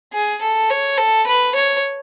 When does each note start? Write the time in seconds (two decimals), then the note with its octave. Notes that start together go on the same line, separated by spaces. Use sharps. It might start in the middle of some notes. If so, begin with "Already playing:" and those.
0.13 G#4
0.41 A4
0.70 C#5
0.98 A4
1.27 B4
1.55 C#5